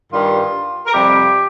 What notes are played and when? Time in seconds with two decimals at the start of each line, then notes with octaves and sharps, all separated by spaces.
0.12 G2 D#3 G3 F4
0.86 A#4
0.92 F2 C3 G3 G4